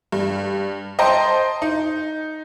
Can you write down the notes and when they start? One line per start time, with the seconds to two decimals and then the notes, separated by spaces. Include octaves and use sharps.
0.12 G2
0.99 C5 D#5 G5 A5 A#5 C6
1.62 D#4